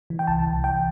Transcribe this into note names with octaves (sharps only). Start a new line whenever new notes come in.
E3
G5
C2 A5
C2
E3 G5